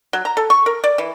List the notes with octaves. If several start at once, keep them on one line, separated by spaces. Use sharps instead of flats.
F#3
A#5
A4
C#6
A#4
D5
E3